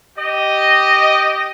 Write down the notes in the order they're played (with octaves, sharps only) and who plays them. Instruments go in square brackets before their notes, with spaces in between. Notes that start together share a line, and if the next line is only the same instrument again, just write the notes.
[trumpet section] G4 D#5